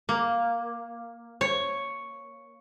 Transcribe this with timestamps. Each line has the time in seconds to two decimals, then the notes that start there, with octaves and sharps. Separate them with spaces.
0.09 A#3
1.41 C#5